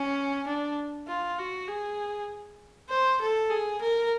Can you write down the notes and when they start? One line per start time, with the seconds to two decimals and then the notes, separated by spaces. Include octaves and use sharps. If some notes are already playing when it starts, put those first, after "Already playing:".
Already playing: C#4
0.47 D4
1.08 F4
1.39 F#4
1.68 G#4
2.90 C5
3.21 A4
3.50 G#4
3.81 A#4